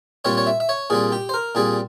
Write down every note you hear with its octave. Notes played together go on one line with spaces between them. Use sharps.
A#2 G3 C4 C#5
C#5
E5
E5
C#5
A#2 G3 C4 G#4
G4
C5
A#4
A#2 G3 C4 G#4